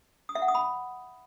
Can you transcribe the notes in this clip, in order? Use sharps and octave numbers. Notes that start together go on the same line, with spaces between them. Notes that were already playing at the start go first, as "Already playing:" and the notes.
D#6
E5
F#5
D#6
B5